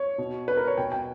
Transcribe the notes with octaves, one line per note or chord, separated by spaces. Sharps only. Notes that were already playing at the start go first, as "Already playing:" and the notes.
Already playing: C#5
B2
B4
A#4
C#5
B2 G5
G5